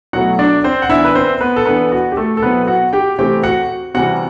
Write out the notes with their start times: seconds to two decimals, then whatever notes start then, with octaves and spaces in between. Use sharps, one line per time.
0.13 B2 F#3 A3 E4 F#4 F#5
0.39 D4 D5
0.64 C4 C5
0.82 F#5
0.89 E3 B3 D4 E4 E5
1.04 B4
1.15 C4 C5
1.41 B3 B4
1.56 A4
1.66 E3 B3 D4 B4
1.92 F#4
2.12 G4
2.17 A3 A4
2.37 A4
2.42 B2 F#3 B3 C4 E4 B4
2.67 F#4 F#5
2.93 G4 G5
3.19 C3 E3 A3 C4 G4 G5
3.43 F#4 F#5
3.94 C3 E3 G3 F#4 F#5